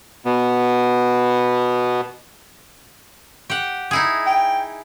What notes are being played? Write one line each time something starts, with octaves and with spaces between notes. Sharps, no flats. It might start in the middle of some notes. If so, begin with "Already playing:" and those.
B2 B3
G4 F#5
D#4 E4 G#4
G5